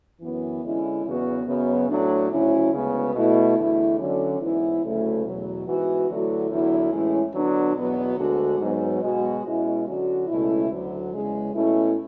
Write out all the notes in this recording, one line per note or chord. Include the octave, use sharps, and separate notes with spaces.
F#2 E3 B3
D3 G#3 C#4 E4
E2 C#3 F#3 B3 F#4
F#2 C#3 F#3 B3
A2 F#3 A3 D4
D2 C#3 F#3 C#4 E4
D2 C#3 G#3 B3
B2 A3 E4
E2 D3 A3 E4
D3 F#3 C#4
G#2 E3 B3 E4
D2 C#3 F#3 A3 E4
E2 B2 F#3
G#2 E3 B3 F#4
D3 F#3 A3 E4
E2 D3 F#3 B3 E4
A2 E3 G#3 C#4 E4
D3 F#3 B3 D4
E2 B2 F#3 B3
D2 D3 G#3 D4 F#4
G#2 F#3 B3
B2 G#3 B3 F#4
B2 G#3 C#4 E4
D3 F#3 C#4 F#4
C#2 B2 A3 C#4 E4
D2 D3 F#3
E2 C#3 G#3
B2 A3 C#4 E4